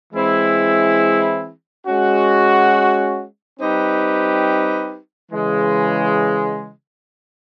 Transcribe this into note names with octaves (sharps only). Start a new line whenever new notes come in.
E3 G#3 C4 E4 G#4
G#3 C#4 F#4
G3 C4 D#4 G4 B4
C#3 E3 G#3